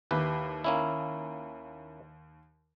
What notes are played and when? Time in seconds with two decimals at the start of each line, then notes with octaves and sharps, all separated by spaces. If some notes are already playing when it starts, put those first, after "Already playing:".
0.11 D#2 E4 G4 B4
0.64 A#3 C#4 E4